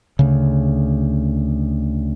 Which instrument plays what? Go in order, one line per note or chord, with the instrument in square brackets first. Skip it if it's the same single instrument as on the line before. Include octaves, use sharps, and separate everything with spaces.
[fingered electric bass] D2 C#3